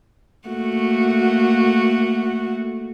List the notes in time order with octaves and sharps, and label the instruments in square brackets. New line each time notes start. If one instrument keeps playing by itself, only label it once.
[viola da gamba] A3 A#3 F#4